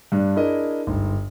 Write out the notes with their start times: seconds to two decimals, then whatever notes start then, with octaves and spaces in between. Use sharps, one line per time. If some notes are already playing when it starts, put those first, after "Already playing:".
0.12 G2 D4
0.35 D4 E4 G#4 A#4 D#5
0.87 G1 G#2